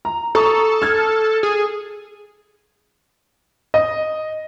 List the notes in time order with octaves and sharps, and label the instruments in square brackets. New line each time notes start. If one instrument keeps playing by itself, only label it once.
[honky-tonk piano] A#5
[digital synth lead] A4 [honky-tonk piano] A#5 C#6 D#6
[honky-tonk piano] F6 G#6
[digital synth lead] G#4
[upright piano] D#5